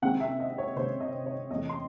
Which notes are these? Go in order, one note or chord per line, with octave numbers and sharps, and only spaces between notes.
C2 C3 D#3 G#3 C4 F#5
E5
D#5
C#5
C2 C3 D#3 G#3 C4 C5
D#5
C#5
E2 C3 E3 A3 D#5
C6